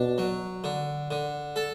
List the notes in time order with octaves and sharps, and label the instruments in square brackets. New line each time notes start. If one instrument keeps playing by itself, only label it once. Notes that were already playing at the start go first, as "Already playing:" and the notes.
Already playing: [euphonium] B2 [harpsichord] D4
[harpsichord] F#3
D3
D3
A4